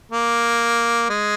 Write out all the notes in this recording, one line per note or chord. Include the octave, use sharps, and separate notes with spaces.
A#3
G#3